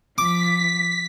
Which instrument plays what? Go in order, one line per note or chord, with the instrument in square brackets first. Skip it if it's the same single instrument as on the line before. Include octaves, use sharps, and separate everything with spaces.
[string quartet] F3 [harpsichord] D6 [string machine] B6